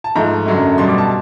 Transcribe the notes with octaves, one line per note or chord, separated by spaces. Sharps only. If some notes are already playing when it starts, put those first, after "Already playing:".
A5
G#2 F3 A3 A#5
F#2 D3 F#3 A3
B2 G3 C6
D6
A5